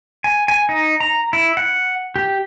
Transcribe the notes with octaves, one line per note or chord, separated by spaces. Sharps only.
G#5
G#5
D#4
A#5
E4
F#5
G4